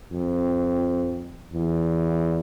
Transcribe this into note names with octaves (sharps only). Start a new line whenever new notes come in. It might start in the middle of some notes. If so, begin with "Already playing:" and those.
F2
E2